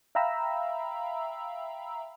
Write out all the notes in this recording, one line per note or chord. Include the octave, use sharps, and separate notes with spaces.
E5 F5 G5 A#5 B5 E6